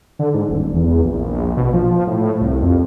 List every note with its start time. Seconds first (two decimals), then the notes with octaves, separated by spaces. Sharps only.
0.19 D3
0.34 G#2
0.49 D#1
0.74 E2
1.05 A#1
1.57 B2
1.73 F3
2.07 A2
2.41 C2
2.62 F2